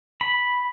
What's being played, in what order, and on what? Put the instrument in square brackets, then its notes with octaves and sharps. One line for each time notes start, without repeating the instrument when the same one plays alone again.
[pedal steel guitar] B5